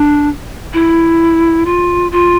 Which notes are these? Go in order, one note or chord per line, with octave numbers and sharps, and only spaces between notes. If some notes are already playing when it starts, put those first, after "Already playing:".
Already playing: D4
E4
F4
F4